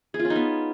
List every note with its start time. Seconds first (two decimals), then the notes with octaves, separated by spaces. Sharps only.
0.14 G#4
0.19 F4
0.25 C#4
0.30 D#4
0.35 B3